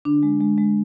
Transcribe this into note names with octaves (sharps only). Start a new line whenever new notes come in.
D3 D4
G#3
G#3
G#3